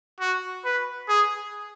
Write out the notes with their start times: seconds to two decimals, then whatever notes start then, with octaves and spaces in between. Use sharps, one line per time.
0.20 F#4
0.65 B4
1.08 G#4